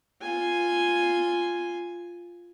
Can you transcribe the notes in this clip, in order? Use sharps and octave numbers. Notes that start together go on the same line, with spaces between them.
F4 G#5